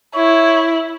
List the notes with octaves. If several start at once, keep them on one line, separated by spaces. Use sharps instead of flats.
E4 C#5